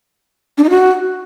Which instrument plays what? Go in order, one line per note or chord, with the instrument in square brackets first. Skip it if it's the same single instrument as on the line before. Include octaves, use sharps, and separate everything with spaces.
[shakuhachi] D4
D#4
F#4